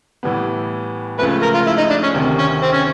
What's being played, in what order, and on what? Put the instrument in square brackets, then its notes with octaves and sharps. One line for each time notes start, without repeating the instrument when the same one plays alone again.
[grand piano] A2 E3 G3 B3
[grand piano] C#2 C#3 F3 A3 [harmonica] B4
[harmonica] A#4
F4
E4
D#4
D4
C#4
[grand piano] D2 C3 D#3
[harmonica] C#4
C4
C#4